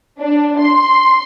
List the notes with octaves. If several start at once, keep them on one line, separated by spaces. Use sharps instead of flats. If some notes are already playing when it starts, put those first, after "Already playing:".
D4
C6